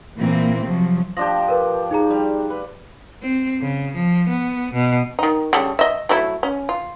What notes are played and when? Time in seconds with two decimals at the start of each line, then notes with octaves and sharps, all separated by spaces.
0.18 A#2 E3 A#3 C4
0.65 C3 F3 F#3
1.17 F3 D4 G4 A#6
1.48 A#4 B4
1.91 D#4 G#4 A#5
2.10 G3
2.50 B4
3.23 C4
3.61 C#3
3.95 F3
4.28 B3
4.73 B2
5.19 D#3 D#4
5.53 C#3 G3 A4
5.79 D#5 E5
6.09 F#3 A3 E4
6.43 C#4
6.69 F4